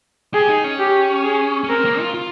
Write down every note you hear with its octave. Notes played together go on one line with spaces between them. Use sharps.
G4 G#4
D#4
C#4
G4
G#4
C#4
C4 A#4
A#3
F4
F4